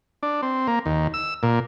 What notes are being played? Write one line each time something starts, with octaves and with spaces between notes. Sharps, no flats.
D4
C4
A#3
D#2
E6
A#2